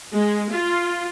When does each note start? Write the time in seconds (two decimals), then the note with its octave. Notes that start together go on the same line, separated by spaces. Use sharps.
0.14 G#3
0.51 F4